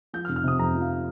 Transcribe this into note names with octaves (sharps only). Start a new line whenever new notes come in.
F3 G6
F6
F1
F6
C3 D#6
F2 A#5
F3
F5